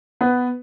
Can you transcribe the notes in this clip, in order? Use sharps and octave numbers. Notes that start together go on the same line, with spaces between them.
B3 B4